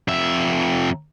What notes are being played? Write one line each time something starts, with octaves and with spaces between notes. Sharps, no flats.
F2 E5